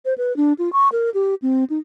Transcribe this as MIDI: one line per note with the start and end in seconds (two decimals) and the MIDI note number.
0.05 0.14 72
0.18 0.35 71
0.37 0.53 62
0.59 0.71 65
0.73 0.89 85
0.92 1.10 70
1.14 1.35 67
1.42 1.64 60
1.70 1.78 63